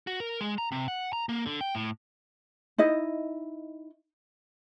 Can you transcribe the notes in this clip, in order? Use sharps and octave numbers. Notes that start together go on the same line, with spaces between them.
F#4
A#4
G#3
A#5
C3
F#5
A#5
A#3
D3
G5
A2
D#4 E4 D#5